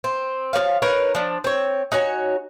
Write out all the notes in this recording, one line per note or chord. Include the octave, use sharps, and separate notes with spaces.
C4
F3 A#3 C#5 F5
D#4 A#4 B4 C#5
F3 D4
C4 C#5
D#4 F#4 C#5 G#5